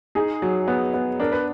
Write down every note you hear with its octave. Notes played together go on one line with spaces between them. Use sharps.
D#4 G#4
F#3
B3
B3
D4 A#4
B4